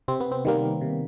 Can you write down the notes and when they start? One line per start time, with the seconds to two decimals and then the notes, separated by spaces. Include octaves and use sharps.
0.08 C3 C4
0.20 B3
0.32 C4
0.45 D#3 G3 A#3
0.81 C3